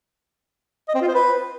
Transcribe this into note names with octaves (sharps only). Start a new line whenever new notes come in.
D#5
C4
F4
C5
B4